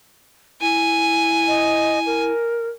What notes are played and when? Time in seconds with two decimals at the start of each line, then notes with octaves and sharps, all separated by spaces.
0.61 E4 G#5
1.47 D#5
2.06 A#4